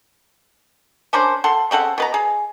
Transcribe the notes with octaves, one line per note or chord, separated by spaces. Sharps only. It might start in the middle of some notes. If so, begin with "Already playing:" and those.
C#4 D4 A#4 C5
A4 F#5 C6
C#3 C4 A4 F#5
B2 B4 A#5
G#4